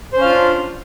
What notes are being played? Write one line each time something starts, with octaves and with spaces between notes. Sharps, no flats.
C#4 D4 F4 C5 F5